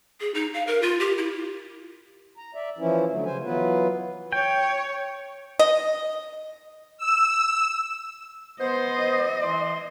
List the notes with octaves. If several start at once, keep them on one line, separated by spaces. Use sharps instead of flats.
G#4
D#4
F5
A#4
F4
G4
E4
A#5
D5 E5
E3 F3 C#4 E4
D3 F#3 A3
C#3 C5 G#5
E3 F#3 B3 F4 B4
C#5 G5
D#5
E6
B3 C5 D#5
E3 C6